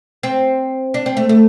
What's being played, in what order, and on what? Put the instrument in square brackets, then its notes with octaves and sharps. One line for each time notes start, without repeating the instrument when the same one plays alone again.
[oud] C4
D4
C4
A3
A3